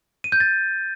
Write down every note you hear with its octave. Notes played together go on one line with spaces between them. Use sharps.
D#7
G6
A6